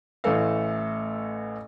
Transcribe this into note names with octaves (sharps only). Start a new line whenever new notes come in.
A1 E3 A3 A4 F5